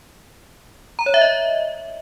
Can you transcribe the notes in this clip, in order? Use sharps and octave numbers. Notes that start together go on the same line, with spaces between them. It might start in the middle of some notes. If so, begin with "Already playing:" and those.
A#5
C#5
E5
D#5